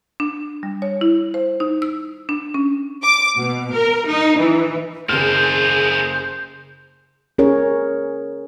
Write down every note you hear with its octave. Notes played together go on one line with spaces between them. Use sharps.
D4
G3
C#5
E4
C5
D#4
E6
D4
C#4
D6
B2
A#4
D#4
E3
F#1 A#3 G#4 A4 C5 F6
C#4 G#4 A#4 C#5